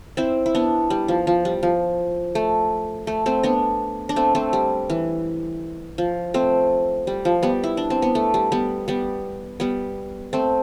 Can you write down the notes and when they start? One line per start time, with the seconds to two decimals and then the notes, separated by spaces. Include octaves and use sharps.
0.17 C4 E4
0.46 E4
0.55 B3 D4
0.90 G3
1.08 F3
1.27 F3
1.45 G3
1.63 F3
2.35 A3
3.07 A3
3.26 A3 C4
3.43 B3 D4
4.09 D4
4.16 A3 C4
4.35 A3 C4
4.53 G3
4.90 E3
5.98 F3
6.34 A3 C4
7.07 G3
7.25 F3
7.43 G3 B3
7.64 E4
7.77 D4
7.90 C4
8.02 B3
8.15 A3
8.34 G3
8.52 G3 B3
8.88 G3 B3
9.60 G3 B3
10.33 A3 C4